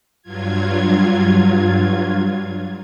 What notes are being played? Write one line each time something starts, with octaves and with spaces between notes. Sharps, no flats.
G2 F#3 F4 G#6